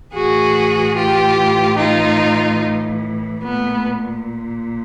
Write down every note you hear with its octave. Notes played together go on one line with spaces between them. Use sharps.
A2 E3 F#4 G#4
F4 G4
D#4 F4
A#2 A3 B3